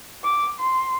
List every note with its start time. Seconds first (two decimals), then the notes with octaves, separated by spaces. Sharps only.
0.24 D6
0.59 C6